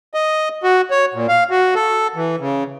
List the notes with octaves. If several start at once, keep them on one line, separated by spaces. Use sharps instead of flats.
D#5
F#4
C#5
A#2
F5
F#4
A4
E3
C#3